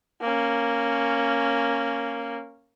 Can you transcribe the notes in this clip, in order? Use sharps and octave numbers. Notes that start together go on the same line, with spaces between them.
A#3 C#4